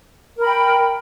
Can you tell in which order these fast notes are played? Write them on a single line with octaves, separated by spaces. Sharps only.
A#4 B5 G5